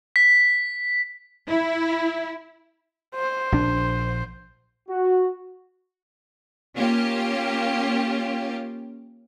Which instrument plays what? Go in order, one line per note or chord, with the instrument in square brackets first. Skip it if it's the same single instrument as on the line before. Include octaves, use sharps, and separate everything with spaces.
[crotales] B6
[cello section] E4
[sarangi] C5
[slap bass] A#1 D4
[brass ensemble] F#4
[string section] A#3 C#4 F4 G4